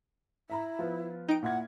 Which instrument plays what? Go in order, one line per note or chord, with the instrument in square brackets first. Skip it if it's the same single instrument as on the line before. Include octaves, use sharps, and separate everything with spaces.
[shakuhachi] E4 [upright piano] E5 A#5 B5
[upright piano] F3 B3 F4
[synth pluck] D#4 D7 [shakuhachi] G5
[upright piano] A#2 E4 G#6 [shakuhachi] F#5